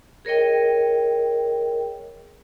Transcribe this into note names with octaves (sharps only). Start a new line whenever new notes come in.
G#4 A#4 C#5 D#5 G5